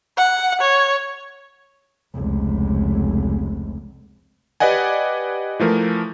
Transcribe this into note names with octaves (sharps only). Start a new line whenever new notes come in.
F#5
C#5
F1 C#2
G4 B4 D5 D#5 F#5 G#5
E3 F3 A3 A#4